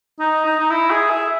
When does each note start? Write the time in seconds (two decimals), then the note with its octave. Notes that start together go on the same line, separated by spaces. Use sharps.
0.20 D#4
0.45 D#4
0.60 D#4
0.70 E4
0.90 G#4
1.10 E5